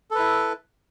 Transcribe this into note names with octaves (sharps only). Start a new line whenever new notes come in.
E4 A4 B4